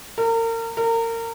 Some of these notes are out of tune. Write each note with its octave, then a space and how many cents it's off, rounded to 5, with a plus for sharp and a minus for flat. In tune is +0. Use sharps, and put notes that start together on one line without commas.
A#4 -35
A#4 -30